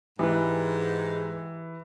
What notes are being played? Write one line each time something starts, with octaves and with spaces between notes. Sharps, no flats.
G#2 E3 G4 B4